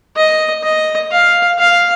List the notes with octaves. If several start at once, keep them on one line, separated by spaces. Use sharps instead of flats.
D#5
D#5
F5
F5